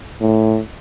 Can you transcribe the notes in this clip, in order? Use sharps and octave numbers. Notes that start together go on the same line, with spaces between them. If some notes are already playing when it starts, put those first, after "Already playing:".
A2